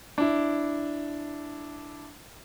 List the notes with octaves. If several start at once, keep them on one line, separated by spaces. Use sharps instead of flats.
D4 E4